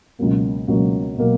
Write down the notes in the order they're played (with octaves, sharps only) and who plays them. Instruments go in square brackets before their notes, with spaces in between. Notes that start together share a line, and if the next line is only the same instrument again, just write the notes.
[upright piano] C#2 B2 F#3 A#3
C#2 B2 F#3 A#3
B2 F#3 A#3